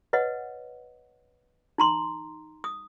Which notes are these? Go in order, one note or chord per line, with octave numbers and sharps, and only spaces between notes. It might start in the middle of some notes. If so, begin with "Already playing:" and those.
B4 C#5 D#5 F#5
D#4 A#5 C6
D#6